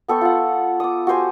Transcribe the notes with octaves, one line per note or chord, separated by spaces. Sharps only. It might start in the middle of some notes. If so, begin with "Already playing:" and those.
B3 A4 G5 C#6
F4 F#5
D6 D#6
F#4 G4 C5 G#5